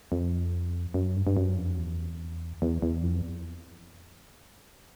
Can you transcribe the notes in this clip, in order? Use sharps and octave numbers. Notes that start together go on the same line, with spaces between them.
F2
F#2
G2
G2
F#2
F2
E2
E2
E2
F2